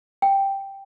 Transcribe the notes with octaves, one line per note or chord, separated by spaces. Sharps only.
G5